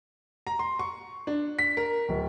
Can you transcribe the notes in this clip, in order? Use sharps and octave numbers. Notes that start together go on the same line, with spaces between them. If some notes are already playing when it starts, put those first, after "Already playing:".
A#5
C6
C#6
D4
B6
A#4
D1